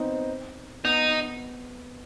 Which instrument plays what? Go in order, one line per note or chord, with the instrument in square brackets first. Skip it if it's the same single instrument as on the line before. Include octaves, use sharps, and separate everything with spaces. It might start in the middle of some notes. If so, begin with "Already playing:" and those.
Already playing: [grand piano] B3 C4 D#4
[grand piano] B3 [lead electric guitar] D#4